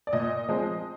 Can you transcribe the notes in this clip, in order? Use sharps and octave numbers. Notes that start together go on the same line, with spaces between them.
D5
A#2 D#5
F3 G#3 C4